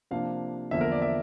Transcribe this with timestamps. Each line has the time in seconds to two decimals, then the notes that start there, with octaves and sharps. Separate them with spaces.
0.11 C3 F3 A#3 D4 F5
0.71 E2 D3 F3 A#3 E5
0.81 A#4
0.92 D5
1.02 E5